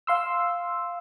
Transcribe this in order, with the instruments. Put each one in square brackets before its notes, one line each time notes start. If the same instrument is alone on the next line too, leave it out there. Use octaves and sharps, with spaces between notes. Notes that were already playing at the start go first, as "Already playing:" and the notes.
[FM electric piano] F5 C6 E6